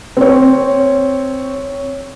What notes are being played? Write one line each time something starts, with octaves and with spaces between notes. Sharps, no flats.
C4 C#5